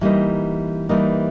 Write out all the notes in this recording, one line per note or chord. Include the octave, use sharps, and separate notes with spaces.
E3 G3 A#3 D#4
E3 G3 A#3 D#4